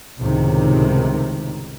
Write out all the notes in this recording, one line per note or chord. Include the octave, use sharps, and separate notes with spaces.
C#2 A2 C3 D#3